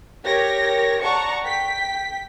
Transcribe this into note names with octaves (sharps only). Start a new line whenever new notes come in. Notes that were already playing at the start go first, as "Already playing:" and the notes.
G4 A#4 C#5 A#6
D5 F#5 A5 A#5 C#6
G5 B6